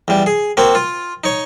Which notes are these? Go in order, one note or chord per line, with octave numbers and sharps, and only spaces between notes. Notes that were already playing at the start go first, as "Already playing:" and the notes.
E2 G3
G#4
A#3 C4 F#4
F4
D#4 C#5